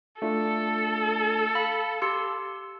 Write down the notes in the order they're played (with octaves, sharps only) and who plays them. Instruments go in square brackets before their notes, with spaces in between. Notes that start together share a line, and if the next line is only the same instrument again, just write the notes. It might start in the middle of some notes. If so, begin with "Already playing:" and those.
[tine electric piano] A3 D4 F4 [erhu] A4
[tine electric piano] F5 [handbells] B5
[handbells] G4 C6 E6